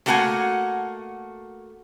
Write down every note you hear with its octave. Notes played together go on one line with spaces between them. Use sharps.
A3 A#3 F#4 A#4 F#5 G#5